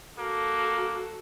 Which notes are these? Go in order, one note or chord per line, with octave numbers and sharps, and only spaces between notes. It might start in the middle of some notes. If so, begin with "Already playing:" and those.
A#3 F#4 A4